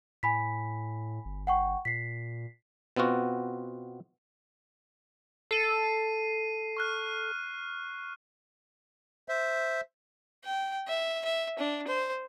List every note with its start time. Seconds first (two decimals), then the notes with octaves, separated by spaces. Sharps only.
0.23 A2 G#5 B5 B6
1.25 G1
1.47 F#5 G5 C#6
1.85 A#2 B6 C7
2.96 B2 B3 C4 F4 F#4
5.51 A4 C7 D#7
6.77 C#6 F6 F#6
9.29 C5 E5
10.44 G5
10.87 E5
11.25 E5
11.59 D4
11.87 C5